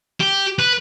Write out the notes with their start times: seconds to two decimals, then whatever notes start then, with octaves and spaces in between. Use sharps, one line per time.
0.21 G4
0.59 B4